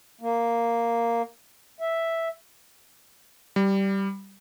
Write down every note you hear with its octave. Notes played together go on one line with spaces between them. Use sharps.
A#3
E5
G3